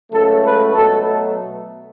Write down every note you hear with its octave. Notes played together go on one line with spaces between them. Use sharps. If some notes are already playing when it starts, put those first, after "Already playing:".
C#2 C#3 F#3 A3 A4
B4
B2 F#3 A3 A4